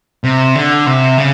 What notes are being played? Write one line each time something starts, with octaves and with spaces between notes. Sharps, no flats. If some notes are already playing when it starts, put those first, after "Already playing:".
C3
D3
C3
C#3